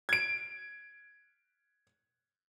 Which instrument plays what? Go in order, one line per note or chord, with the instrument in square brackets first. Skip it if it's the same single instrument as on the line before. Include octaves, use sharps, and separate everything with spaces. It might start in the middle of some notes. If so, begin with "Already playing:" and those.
[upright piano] G#6 D7